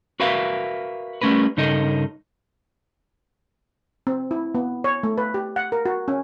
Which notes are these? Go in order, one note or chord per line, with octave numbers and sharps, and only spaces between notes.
F#4 A#4 B4 E5 F5
G3 A3 C#4 A#4 B4
G2 C#3 D#4 A4 A#4 D#5
C4
E4
B3
C#5
A3
B4
G4
F#5
A#4
F#4
C#4